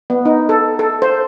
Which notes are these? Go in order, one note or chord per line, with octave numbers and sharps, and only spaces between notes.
B3
D#4
A4
A4
C5